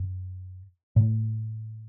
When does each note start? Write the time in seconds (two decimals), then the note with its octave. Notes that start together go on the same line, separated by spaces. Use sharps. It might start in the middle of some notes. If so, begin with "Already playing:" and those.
Already playing: F#2
0.96 A2